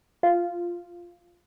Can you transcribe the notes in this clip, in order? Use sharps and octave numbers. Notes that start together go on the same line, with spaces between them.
F4